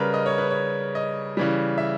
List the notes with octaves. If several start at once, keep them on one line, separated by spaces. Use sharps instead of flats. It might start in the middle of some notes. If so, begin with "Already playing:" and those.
Already playing: C#3 G3 A#4 B4
D#5
C#5
B4
C#5
D#5
C#3 E3 G3
E5